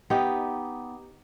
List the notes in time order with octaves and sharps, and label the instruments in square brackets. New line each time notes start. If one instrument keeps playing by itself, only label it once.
[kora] B3 D#4 G4